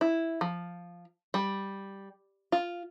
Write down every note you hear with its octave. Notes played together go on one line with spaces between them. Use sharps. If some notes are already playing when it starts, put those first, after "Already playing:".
E4
F3
G3
F4